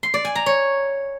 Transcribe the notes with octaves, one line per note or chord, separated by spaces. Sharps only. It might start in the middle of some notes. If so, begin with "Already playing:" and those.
C6
D5
G#5
A#5
C#5